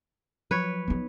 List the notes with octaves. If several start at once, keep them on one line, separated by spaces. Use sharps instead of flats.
F3 F#3 B4 C#5
B3 D#4